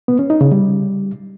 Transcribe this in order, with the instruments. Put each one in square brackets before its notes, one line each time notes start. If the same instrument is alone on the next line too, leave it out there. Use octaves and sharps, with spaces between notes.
[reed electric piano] B3
C#4
D#4
C#3
G3